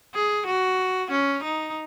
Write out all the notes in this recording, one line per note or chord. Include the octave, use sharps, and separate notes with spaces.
G#4
F#4
C#4
D#4